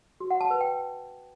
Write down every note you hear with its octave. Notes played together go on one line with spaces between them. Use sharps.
F#4
F#5
A5
B4
G5